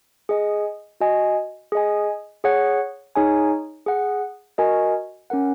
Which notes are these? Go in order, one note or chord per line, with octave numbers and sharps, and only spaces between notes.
G#4 D#5 G#5
F#4 D#5 G#5
G#4 D#5 G#5
G#4 C#5 F#5
D#4 G#4 C#5 G#5
G#4 F#5
F#4 A#4 D#5 G#5
C#4 A#4 F#5